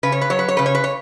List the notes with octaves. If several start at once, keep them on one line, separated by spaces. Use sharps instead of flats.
C#3 B4
C#5
B4
F#3 C#5
B4
C#5
C#3 B4
C#5
B4
C#5